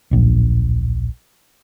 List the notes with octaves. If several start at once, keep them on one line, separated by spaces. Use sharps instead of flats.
D1 A#1